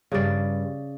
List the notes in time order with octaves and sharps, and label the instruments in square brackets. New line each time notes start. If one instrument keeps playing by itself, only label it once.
[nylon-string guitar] G2 G3 [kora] C#3 D5